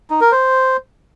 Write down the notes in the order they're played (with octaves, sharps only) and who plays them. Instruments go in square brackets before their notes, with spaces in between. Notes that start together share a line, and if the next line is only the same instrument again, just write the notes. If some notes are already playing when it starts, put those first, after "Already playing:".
[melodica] D#4
A#4
C5